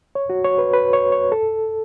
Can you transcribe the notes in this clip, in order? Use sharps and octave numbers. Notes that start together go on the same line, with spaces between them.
C#5
F#4
C#5
B4
B4
C#5
C#5
A4